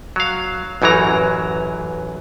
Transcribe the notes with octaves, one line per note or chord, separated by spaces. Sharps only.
F#3 F5
A1 F#2 E3 F#3 A#5